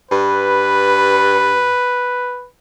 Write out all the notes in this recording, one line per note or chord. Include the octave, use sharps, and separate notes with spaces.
G2 B4